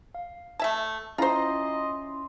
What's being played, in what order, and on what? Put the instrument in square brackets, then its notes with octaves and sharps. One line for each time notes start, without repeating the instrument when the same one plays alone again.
[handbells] F5
[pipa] A3 E5 A5 [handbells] G#6
[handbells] C#4 E4 D5 [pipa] F4 C5 [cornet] D#5 [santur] A#5 C6